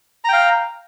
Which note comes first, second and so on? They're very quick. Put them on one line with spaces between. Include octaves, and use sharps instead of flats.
A#5 G5 F5